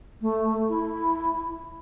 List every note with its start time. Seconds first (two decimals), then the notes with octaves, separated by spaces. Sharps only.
0.21 A3
0.69 E4